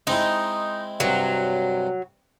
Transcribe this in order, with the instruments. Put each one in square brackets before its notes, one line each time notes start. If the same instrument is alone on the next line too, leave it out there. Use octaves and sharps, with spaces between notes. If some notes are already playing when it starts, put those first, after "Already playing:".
[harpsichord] G#3 C4 E4 [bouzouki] D#4
[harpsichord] G2 C3 [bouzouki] F#3